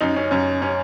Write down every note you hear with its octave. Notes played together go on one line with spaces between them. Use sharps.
F#2 D#4
C#4
F#2 C#4
C#4